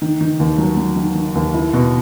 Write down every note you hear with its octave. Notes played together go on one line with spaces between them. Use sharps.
D#3
D#3
D#2
F#3
F#3
D#3
D#3
D#2
E4
B2